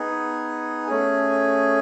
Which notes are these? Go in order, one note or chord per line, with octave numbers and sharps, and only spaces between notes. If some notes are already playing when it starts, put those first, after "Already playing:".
Already playing: B3 D#4 G#4
A3 C#4 G#4